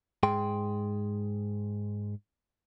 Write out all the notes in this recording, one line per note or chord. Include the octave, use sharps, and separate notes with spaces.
G#2 G#4 G5 C6